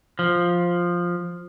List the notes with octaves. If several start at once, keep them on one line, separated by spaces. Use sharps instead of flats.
F3